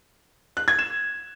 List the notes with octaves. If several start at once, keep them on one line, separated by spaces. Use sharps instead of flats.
F#6
G#6
E7